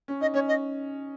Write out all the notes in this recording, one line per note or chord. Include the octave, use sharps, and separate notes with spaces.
C#4
D#4 D#5
C#4 C#5
D#5